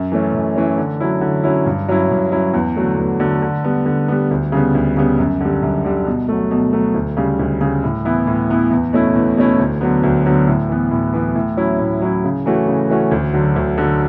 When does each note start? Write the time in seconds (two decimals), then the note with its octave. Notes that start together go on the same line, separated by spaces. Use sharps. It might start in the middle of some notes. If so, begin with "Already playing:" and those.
Already playing: F#2
0.12 E3 A3 C#4
0.33 F#2
0.56 E3 A3 C#4
0.78 D3
1.00 F#3 C#4 E4
1.21 D3
1.43 F#3 C#4 E4
1.66 G2
1.88 F#3 C#4 E4
2.10 G2
2.32 F#3 C#4 E4
2.54 E2
2.76 D3 F#3 A3
2.98 E2
3.20 D3 F#3 A3
3.42 D3
3.64 G3 B3
3.86 D3
4.08 G3 B3
4.31 D2
4.52 C#3 G3 B3
4.74 D2
4.97 C#3 G3 B3
5.19 F#2
5.41 D3 G3
5.62 F#2
5.84 D3 G3
6.06 B2
6.29 F#3 A3
6.51 B2
6.73 F#3 A3
6.94 D2
7.17 C#3 G3
7.39 D2
7.61 C#3 G3
7.84 A2
8.05 E3 B3 E4
8.27 A2
8.50 E3 B3 E4
8.71 E2
8.93 B2 A3 C#4 E4
9.15 E2
9.37 B2 A3 C#4 E4
9.59 D2
9.81 D3 F#3 B3
10.03 D2
10.26 D3 F#3 B3
10.47 A2
10.69 E3 B3
10.91 A2
11.13 E3 B3
11.35 A2
11.57 F#3 C#4 E4
11.79 A2
12.01 F#3 C#4 E4
12.24 C#3
12.46 E3 A3 C#4 F#4
12.67 C#3
12.89 E3 A3 C#4 F#4
13.11 D2
13.34 D3 F#3
13.56 D2
13.78 D3 F#3